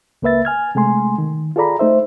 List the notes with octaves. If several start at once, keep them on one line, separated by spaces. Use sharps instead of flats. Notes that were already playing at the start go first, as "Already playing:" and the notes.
C#2 A#3 B4 E5 A6
G#5 F6 G#6
C3 G#3 A3 G#5 C6
D#3
F4 G#4 A4 D5 A#5 B5
A3 D#4 C5 E5